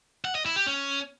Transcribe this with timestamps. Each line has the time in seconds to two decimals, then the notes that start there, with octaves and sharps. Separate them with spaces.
0.25 F#5
0.35 D#5
0.46 E4
0.56 G4
0.67 C#4